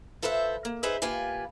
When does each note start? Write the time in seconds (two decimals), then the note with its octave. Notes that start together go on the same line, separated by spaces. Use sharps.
0.22 F4 A4 B4 C5 D#5 E5
0.65 A#3
0.83 D#4 G#4 B4 C5 E5
1.02 A#3 F4 G4 B4 G#5